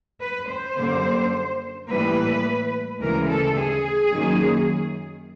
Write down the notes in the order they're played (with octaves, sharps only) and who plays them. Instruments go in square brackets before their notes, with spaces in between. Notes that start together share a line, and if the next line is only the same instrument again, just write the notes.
[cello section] B4
C5
F#2 D3 G3 A#3
A2 E3 G3 A#3 B4
D2 C#3 E3 G#3 A#4
A4
G#4
F#2 D#3 F#3 A#3